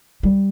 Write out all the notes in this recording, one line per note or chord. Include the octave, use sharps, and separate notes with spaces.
G3